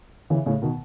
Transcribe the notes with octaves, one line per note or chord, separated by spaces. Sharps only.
C#3 E3
A2 C#3
B2 D#3